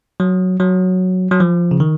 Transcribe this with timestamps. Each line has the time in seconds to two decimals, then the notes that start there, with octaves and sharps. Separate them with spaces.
0.20 F#3
0.60 F#3
1.31 F#3
1.40 F3
1.71 C#3
1.80 D#3